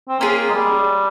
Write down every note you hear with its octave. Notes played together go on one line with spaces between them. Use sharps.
C4
A#3 C#4 F4 G#4
G#3
G3